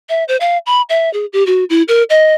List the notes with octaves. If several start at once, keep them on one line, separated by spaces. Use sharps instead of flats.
E5
C5
F5
B5
E5
G#4
G4
F#4
E4
A#4
D#5